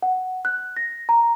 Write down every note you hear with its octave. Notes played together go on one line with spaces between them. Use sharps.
F#5
F#6
A#6
A#5